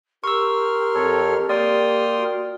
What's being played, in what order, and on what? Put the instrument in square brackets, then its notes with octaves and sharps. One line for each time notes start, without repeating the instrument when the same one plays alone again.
[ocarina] G4 [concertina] A#4 C6 F6 [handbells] C#6 E6
[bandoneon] F2 A4 C#5
[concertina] A#3 G5 F6 [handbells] D5 [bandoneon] C6 D#6
[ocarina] F#4